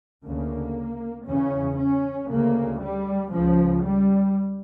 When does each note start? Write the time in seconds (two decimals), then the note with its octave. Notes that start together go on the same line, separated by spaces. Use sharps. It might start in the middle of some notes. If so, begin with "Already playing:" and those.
0.25 D2 C#3 A#3
1.27 E2 C#3 C#4
1.78 C#4
2.30 D2 C#3 A#3
2.82 G3
3.33 C#2 C#3 F3
3.84 G3